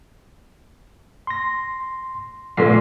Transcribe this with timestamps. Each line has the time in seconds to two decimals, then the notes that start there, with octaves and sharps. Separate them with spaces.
1.27 C6 A#6
2.57 A#1 A3 C6 B6 C7